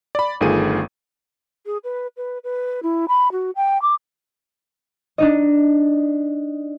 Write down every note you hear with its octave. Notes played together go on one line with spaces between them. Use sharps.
D5 B5
G1 D#3 A3 F4 G#4 D#7
G#4
B4
B4
B4
E4
B5
F#4
G5
D6
D4 D#4 D#5